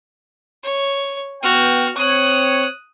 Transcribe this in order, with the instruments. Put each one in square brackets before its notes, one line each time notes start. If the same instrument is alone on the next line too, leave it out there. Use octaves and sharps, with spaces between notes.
[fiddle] C#5
[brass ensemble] B3 G5 [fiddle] F#4 F6
[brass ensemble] C4 C#5 [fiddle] D#6 F#6